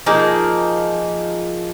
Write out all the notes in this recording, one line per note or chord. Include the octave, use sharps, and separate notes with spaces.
F3 A#3 D#4 G#4